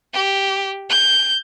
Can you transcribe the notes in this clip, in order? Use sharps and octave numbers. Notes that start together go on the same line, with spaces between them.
G4
G6